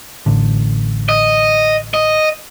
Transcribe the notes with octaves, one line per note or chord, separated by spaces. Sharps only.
A1 A2 D3
D#5
D#5